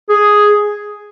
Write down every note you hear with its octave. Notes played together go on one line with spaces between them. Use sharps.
G#4